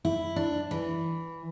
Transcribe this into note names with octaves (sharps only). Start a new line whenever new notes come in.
E4
D4
E3